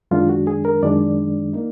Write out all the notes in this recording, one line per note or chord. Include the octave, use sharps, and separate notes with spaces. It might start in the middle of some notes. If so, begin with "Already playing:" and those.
F#2 D#3 G#3 D4 F4
F#4
G#4
A#4
F#2 D#3 G#3 D4 D5
A#3 D#4